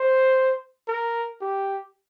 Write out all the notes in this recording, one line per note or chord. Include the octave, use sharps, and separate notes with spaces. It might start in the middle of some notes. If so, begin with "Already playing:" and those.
Already playing: C5
A#4
G4